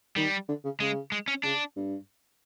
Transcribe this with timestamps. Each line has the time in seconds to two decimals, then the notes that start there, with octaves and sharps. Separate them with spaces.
0.16 D#3 G3
0.48 D3
0.64 C#3
0.80 C#3 G#3
1.12 G#3
1.28 C#4
1.43 C#3 D4
1.76 G2